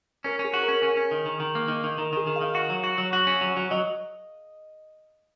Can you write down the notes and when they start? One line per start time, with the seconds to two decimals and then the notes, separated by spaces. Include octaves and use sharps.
0.24 C#4 A#4
0.39 C#4
0.45 G#4
0.54 F#4
0.63 A#4
0.68 C#4
0.83 C#4
0.97 C#4
1.11 D#3
1.26 D#3
1.40 D#3
1.55 A#3
1.68 D#3
1.84 D#3
1.98 D#3 A#4
2.13 D#3 G#4
2.27 D#3
2.36 F5
2.41 D#3
2.55 F#4
2.70 F#3
2.84 F#4
2.98 F#3
3.13 F#4
3.27 C#4
3.41 F#3
3.57 F#3
3.71 F#3 D#5